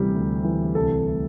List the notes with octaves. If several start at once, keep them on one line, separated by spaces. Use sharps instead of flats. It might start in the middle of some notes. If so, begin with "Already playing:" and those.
Already playing: D2 C3 E3 G3 G4
D2
E3
C2 A4
A3